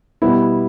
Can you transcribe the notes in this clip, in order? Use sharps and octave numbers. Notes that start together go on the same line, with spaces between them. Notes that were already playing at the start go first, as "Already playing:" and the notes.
B2 G3 B3 E4